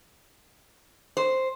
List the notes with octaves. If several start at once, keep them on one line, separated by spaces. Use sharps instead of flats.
C5